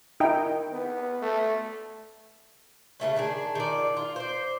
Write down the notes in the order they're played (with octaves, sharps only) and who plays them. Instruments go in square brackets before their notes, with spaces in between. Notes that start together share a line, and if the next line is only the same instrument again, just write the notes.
[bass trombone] D#3 [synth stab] D#4 E4 G5
[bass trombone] B3
A3
[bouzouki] C#3 F3 A3 C#4
D#3 D4 G#4
D#3 F4 D5
F4
C5 D5